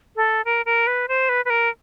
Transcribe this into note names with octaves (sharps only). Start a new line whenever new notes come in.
A4
A#4
A#4
B4
C5
B4
B4
A#4